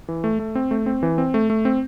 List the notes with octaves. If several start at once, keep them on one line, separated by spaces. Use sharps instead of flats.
E3
A3
A3
C4
A3
C4
E3
C4
A3
A3
C4